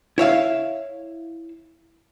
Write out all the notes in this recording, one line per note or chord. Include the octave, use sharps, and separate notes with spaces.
E4 C#5 E5 F5